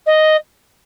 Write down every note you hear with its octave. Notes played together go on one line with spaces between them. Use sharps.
D#5